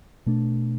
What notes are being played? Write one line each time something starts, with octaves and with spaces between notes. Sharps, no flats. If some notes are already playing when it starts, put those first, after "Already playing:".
B2 A3 D4